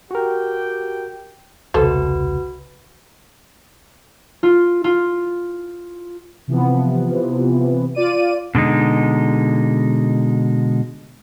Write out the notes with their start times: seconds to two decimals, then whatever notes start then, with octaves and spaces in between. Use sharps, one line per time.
0.11 F#4 G4 A#4 G5
1.74 E1 C2 C#3 A3 F#4 A4 B4 C5
4.43 F4
4.84 F4
6.48 C3 E3 F3 B3
7.95 F4 D5 D#7
8.55 B2 D3 G#3 D#4